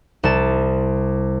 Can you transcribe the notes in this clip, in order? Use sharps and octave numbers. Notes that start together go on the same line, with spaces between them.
C2 A5